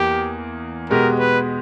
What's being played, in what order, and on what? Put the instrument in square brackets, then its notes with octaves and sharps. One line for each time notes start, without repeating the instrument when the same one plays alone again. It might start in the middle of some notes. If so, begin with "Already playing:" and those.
Already playing: [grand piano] E2 A#3 [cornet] G4
[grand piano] B2 G#3 B3 G4 [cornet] A#4
[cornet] B4